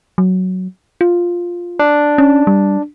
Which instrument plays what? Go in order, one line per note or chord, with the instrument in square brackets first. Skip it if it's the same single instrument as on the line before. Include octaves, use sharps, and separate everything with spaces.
[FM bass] F#3
F4
[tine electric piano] D4
[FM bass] C#4
G3